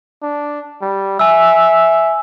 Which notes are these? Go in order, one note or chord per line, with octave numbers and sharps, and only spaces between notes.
D4
G3
E5 G#5 E6